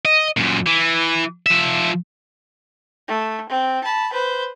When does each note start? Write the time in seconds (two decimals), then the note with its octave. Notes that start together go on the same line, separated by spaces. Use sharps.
0.05 D#5
0.37 F#2 A#2
0.67 E3
1.46 F3 E5
3.08 A3
3.49 C4
3.84 A5 B5
4.13 B4 C5